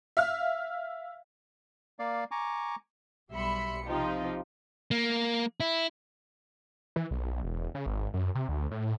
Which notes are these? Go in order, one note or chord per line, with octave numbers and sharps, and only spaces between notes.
E5 F5 F6
A#3 D5 F5
G#5 A#5 C#6 D6
B1 G3 E5 B5 C6 C#7
C3 F3 D#4 F4 G4
A#3
E4
E3
B1
E1
C#3
G#1
F#2
C3
D2
A2